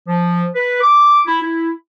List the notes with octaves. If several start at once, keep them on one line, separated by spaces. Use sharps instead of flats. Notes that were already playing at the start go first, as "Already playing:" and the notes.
F3
B4
D6
E4
E4